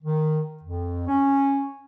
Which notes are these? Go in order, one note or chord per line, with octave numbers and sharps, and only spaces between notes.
D#3
F2
C#4